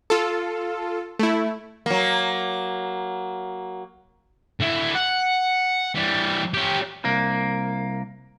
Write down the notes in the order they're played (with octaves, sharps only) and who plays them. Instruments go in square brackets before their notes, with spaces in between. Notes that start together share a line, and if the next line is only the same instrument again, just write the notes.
[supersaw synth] F4 A4
A3 E4
[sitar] F#3 A#3
[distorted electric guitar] D3 E4
F#5
E3 G3
C#4 G4
[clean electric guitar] C2 A#3